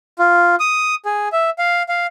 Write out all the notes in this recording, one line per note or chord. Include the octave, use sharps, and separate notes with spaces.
F4
D#6
G#4
E5
F5
F5